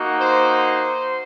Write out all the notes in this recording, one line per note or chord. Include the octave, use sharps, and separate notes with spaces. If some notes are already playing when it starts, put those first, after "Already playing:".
Already playing: A#3 D#4 F#4
C5
C5